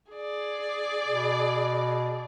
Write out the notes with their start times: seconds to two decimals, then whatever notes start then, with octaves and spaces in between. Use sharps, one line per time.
0.11 G#4 D5
1.08 B2